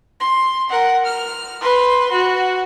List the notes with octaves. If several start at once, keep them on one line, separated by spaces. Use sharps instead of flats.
C6
A#4 F#5
F6
B4 C6
F#4